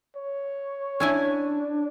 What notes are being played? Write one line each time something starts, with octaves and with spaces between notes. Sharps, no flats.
C#5
C#4 D4 E4 G#5